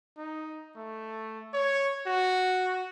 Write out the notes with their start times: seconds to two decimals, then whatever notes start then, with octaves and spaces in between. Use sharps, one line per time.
0.17 D#4
0.76 A3
1.54 C#5
2.07 F#4